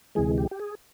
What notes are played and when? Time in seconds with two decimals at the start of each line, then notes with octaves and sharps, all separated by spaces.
0.15 D2 C3 E3 G#3 G#4
0.38 G4
0.51 G4
0.60 G#4